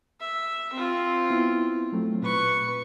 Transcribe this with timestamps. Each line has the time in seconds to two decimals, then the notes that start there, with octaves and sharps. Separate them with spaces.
0.20 E5
0.73 C4 F4
1.30 B3 E4
1.93 F#3 A3 C4
2.22 A#2 B4 C#6